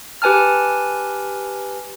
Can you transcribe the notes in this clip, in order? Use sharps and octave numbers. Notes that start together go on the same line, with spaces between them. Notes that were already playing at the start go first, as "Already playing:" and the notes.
G4 B4 G#5 A5 F6